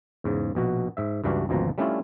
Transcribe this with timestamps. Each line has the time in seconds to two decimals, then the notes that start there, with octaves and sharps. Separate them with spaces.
0.24 E2 G#2 C#3
0.55 A#1 B2 F#4
0.97 G#2 E5
1.24 C#2 G2 E3 D4 F#4
1.49 G#1 D2 B2 F3 A#5
1.78 G3 A3 C#4 D4 E4 F4